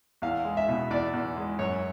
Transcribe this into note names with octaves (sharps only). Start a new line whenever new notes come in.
E2 F5
G#3
E5
B2
E2 D5
E2
G#3
F#2 C#5